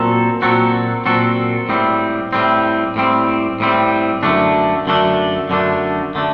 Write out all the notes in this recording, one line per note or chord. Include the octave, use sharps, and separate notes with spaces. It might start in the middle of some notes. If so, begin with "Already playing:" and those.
Already playing: A#2 F#3 C4 F#4 A4
A#2 F#3 C4 F#4 A4
A#2 F#3 C4 F#4 A4
A2 G3 C4
A2 G3 C4
A2 G3 C4
A2 G3 C4
F#2 D3 A3 D4
F#2 D3 A3 D4
F#2 D3 A3 D4
D3 A3 D4